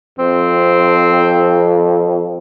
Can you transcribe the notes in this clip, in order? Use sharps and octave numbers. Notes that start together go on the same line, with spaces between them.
F2 C4